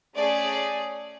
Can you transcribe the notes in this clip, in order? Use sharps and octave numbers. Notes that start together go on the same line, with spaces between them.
A3 C#4 G#4 D5